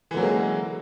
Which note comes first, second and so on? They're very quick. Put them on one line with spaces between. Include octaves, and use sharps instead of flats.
E3 D3 F#3 A#3 G#3